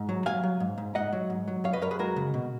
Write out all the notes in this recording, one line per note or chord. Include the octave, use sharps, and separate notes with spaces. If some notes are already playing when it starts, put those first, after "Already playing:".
Already playing: G#2
F#3
F#3 F5 G#5
F#3
G#2
G#2
G#2 D#5 F#5
F#3
G#2
F#3
F#2 C#5 F5
B4 D#5
F#2 A#4 C#5
G#4 B4
G#3 F#4 A#4
C#3
B2